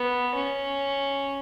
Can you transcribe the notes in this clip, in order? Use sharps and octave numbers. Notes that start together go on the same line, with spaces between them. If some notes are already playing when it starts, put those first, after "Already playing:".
Already playing: B3
C#4